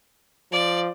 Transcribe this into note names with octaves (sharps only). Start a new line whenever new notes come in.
F3 D5